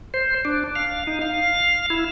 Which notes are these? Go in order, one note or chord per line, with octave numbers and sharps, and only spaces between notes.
C5
D4
F5
D#4
F5
E4